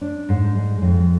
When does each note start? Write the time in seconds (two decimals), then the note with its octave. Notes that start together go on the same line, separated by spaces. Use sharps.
0.01 D4
0.29 G#2
0.55 G#3
0.82 F2